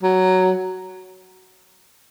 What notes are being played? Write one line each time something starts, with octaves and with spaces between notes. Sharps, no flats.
F#3